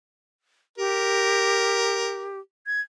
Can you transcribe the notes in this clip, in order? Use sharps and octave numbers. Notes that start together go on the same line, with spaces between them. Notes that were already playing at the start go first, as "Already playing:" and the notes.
G4 A#4
G#6